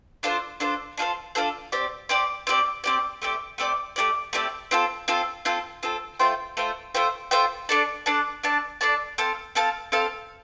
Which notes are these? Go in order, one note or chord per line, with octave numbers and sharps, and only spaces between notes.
D4 F4 A4 C5
D4 F4 A4 C5
D4 F4 A4 C5
D4 F4 A4 C5
C4 G4 D5
C4 G4 D5
C4 G4 D5
C4 G4 D5
A3 C4 G4 D5
A3 C4 G4 D5
A3 C4 G4 D5
A3 C4 G4 D5
C4 F4 A4
C4 F4 A4
C4 F4 A4
C4 F4 A4
A3 F4 C5 G5
A3 F4 C5 G5
A3 F4 C5 G5
A3 F4 C5 G5
D4 A4 D5 A5
D4 A4 D5 A5
D4 A4 D5 A5
D4 A4 D5 A5
C4 A4 F5 A5
C4 A4 F5 A5
C4 A4 F5 A5